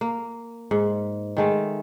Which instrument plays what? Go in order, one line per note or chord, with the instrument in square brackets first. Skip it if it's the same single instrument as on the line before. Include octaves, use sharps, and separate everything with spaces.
[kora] A#3
G#2
D#3 G#3 A3